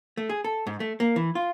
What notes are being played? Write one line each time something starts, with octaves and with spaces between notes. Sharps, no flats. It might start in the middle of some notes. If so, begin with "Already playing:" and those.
A3
G#4
A4
G#2
A3
A#3
E3
F4